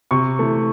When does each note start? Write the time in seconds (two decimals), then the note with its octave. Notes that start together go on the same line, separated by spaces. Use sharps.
0.11 C3 C#6
0.39 E3 A3